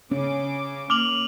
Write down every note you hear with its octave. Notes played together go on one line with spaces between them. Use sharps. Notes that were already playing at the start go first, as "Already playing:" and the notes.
C#3 C#4 D6
A#3 D6 F6 F7 F#7